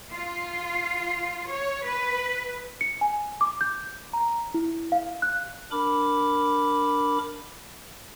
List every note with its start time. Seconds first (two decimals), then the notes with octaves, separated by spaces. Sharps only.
0.11 F4
1.50 C#5
1.86 B4
2.81 C#7
3.01 G#5
3.41 D6
3.61 G6
4.13 A#5
4.54 E4
4.92 F5
5.22 F#6
5.71 D4 A#4 B5 D6